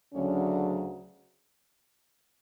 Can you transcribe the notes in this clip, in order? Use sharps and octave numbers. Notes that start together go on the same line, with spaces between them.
D2 C#3 F#3 C#4